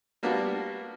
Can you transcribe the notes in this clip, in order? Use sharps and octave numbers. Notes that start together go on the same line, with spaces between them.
G3 A#3 B3 D4 F#4